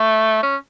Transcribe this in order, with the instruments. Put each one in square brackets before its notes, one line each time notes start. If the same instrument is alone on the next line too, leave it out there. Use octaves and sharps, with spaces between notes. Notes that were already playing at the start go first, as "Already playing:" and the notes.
Already playing: [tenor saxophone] A3
C#4